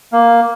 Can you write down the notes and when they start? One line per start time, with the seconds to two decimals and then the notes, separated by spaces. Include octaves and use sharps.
0.13 A#3